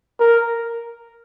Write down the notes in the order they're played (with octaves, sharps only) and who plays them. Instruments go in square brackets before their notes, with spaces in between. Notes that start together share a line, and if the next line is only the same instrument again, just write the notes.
[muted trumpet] A#4